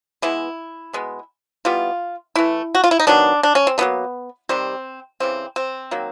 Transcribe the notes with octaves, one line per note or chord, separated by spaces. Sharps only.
E3 G#3 B3 E4
B2 G#3 B3
E3 G3 B3 F4
E3 A3 E4
F#4
F4
E4
D#4
D#3 F#3 B3 D4
D4
C#4
C4
D3 F#3 A#3 B3
C3 D#3 G3 C4
C#3 E3 G3 C4
C4
D#3 F#3 A#3